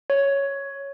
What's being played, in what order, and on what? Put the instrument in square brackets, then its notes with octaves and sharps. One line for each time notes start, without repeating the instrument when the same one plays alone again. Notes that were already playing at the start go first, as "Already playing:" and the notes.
[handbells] C#5